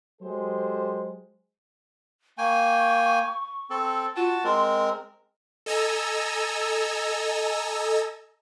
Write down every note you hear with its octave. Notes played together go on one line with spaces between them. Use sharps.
F#3 G#3 G4 A4 C5
A#3 G5 G#5 C#6
C4 A4
F4 F#4 A5
G#3 C4 A#4 C6
A4 D#5 G#5 A#5 E6